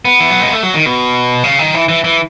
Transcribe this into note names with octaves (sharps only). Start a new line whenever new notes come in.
B3
E3
F#3
G#3
A3
F#3
D#3
B2
C#3
D#3
E3
E3
E3